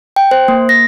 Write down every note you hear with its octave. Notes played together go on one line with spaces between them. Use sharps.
G5
C5
A#3
A#6